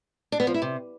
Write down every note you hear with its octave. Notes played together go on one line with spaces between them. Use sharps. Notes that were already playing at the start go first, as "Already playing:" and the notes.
D4
B3
F3
E4
C3